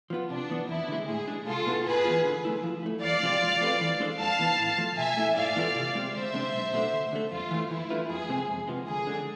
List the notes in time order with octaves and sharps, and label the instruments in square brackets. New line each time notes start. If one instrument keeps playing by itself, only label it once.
[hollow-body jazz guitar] F3 B3 F4
[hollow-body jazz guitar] C3 [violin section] D4
[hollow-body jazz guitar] E3 B3
[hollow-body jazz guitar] E2 [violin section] E4
[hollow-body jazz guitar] D3 G#3
[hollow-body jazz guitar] A2 [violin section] G#4
[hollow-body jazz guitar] G#3 D4
[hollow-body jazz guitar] C2 [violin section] F4 A4
[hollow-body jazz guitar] B2 B3 E4 G#4
[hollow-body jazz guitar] G#2 [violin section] G#4 B4
[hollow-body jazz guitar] E3 B3 F4
D3
F3 A3 E4
F3
A3 E4
[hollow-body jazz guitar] E2 [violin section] D5 F5
[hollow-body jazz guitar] C3 F3 G#3 C4
F3
A3 C4 F4 B4
E3
G#3 D4 A4 C5
[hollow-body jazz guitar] F2 [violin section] F5 A5
[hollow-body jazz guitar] E3 B3 E4
A2
F3 A3
[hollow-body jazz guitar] B2 [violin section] E5 G#5
[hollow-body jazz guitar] A3 E4 A4
[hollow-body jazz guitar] G#2 [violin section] D5 F5
[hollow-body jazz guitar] E3 B3 F4 A4
C3
G#3 C4 G#4 C5
[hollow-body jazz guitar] D2 [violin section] C5 E5
[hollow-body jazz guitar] C3 G#3 D4
B1
B2 A3 D4
D2
D3 A3
[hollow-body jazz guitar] F2 [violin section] F4
[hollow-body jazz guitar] E3 A3 E4
[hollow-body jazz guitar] E3 [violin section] E4
[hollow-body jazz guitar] A3 D4 F4 B4
[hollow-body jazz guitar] F2 [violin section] G#4
[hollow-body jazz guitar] C3 G#3 C4
F2
C3 F3 G#3 B3
[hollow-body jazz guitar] D2 [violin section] G#4
[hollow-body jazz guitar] D3 G#3 D4